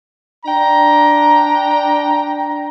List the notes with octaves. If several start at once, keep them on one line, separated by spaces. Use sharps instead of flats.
D4 G5 A#5